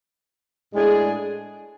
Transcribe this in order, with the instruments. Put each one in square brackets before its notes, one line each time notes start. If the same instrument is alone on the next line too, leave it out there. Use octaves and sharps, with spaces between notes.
[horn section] A2 G#3 D4 G#4